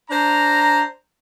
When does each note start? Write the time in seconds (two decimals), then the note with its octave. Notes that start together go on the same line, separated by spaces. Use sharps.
0.11 D4 C5 A#5